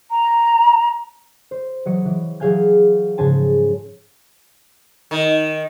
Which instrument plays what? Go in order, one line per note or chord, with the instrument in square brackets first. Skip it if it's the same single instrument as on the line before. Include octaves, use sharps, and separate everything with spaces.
[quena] A#5
[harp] C5
E3 F#3 D#5 C#7
E3
E3 F#3 G#4 F5 G#5 G6
G#2 C#3 F3 G#5 A5 C6
[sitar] D#3